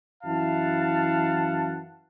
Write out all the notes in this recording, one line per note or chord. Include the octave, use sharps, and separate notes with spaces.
F#2 E3 E4 F5 F#5 A5